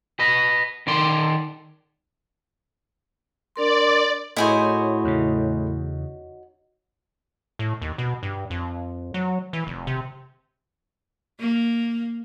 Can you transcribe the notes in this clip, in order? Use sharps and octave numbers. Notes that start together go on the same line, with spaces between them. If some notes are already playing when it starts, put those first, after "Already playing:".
B4 D#5
D#3 D5 C6
D4 A#4 D5 C6
A2 D#4 E4 F#4 G#4 C5 C#5
E2 C#3
A2
D#2
B2
G2
F2
F#3
E3
F1
C3
A#3